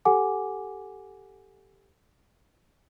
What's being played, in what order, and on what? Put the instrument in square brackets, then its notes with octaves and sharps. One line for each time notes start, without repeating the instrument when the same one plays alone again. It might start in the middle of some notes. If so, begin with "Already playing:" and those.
[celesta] G4 A4 F#5 G#5 D6